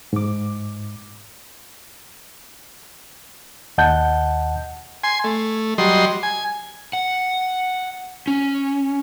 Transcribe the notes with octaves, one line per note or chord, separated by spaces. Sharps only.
G#2 D6
D#2 D#5 F#5 A5 G6
G#5 C6
A3
F#3 G3 D#5 C6
G#5
F#5
C#4